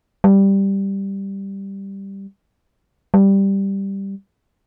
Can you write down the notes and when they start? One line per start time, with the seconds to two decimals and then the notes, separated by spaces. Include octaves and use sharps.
0.24 G3
3.14 G3